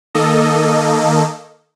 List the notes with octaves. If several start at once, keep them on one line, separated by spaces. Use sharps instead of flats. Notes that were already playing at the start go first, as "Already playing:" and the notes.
D#3 A#3 A4 D#5